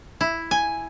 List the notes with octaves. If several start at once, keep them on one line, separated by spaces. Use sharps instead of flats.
E4
G#5